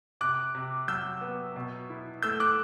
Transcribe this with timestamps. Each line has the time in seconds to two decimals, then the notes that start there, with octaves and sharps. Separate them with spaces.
0.21 C3 D6 F#6
0.55 C3
0.88 F#3 E6 G6
1.21 B3
1.56 B2
1.90 E4
2.23 A3 E6 G6
2.40 D6 F#6